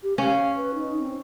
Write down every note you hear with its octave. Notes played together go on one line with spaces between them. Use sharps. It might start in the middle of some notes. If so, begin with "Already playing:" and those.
G4
C#4 F5
B4
D#4
C4